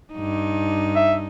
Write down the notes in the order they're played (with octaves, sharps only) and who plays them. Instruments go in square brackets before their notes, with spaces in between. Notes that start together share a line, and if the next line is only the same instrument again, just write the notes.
[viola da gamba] G2 D#4
[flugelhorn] E5